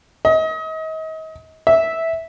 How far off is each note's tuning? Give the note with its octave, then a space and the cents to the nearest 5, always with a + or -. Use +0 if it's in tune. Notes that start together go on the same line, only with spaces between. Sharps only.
D#5 +35
E5 -10